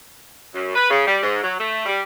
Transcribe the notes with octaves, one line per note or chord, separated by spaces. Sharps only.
F#2
B4
C#3
G3
G#2
F#3
A3
G3